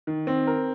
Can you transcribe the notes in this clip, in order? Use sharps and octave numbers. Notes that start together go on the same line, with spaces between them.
D#3
C4
A#4